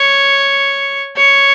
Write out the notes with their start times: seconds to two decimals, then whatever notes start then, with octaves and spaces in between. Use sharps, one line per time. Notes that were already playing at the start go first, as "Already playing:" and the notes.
Already playing: C#5
1.17 C#5